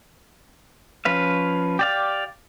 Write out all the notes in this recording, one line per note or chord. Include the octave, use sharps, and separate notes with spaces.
F3 C#4 B4 F5
G4 D5 F5